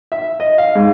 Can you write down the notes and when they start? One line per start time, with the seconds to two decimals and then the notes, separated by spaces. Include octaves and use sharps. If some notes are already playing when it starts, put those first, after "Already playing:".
0.12 E5
0.40 D#5
0.58 F5
0.75 G#2